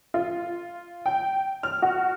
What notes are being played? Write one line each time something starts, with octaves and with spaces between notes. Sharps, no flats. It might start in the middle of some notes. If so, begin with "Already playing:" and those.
F4
G5
F6
F#4